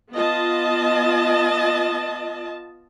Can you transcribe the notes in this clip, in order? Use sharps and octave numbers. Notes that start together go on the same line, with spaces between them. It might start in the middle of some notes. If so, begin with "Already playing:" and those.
B3 F4 D#5 A5